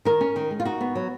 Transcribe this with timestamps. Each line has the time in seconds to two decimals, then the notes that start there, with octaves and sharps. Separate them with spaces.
0.05 D#3 A#4
0.21 C#4
0.36 D#3
0.51 G#3
0.60 F4
0.65 D#4 F#4
0.81 B3
0.95 F#3